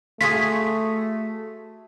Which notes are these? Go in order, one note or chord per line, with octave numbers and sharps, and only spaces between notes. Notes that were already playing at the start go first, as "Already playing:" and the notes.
A3 F4 F#4 G#4 B6